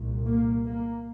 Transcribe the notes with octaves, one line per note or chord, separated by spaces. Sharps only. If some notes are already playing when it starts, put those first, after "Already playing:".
Already playing: C2 A#2
A#3
A#3